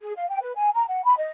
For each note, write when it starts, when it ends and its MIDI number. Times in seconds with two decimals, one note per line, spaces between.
0.01 0.12 68
0.16 0.28 77
0.29 0.38 79
0.41 0.52 71
0.56 0.69 80
0.74 0.86 82
0.88 1.04 78
1.04 1.15 83
1.17 1.31 75